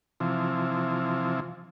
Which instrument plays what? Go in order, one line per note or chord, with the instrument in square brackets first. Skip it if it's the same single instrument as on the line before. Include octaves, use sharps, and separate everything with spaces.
[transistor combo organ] C3 E3 F3